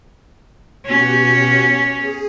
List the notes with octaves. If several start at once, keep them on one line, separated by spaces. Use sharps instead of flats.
B2 C#4 F#4 G4
G#4